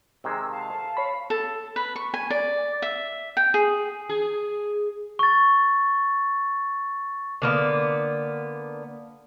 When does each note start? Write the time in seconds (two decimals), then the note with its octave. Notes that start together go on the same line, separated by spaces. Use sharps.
0.24 C3 D#3 G#3 E6
0.50 F5 A5
0.74 A4
0.97 C#5 B5
1.30 A4
1.76 B4
1.96 C#6
2.14 G#5
2.30 D5
2.82 E5
3.37 G5
3.54 G#4
4.09 G#4
5.19 C#6 A6
7.42 D3 A#3 B3